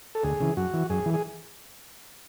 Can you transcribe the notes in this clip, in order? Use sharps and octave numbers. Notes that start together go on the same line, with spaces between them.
A4
D2 G#4
C#3 E3
F#2 F#4
E3
F#2 G#4
E3
G#4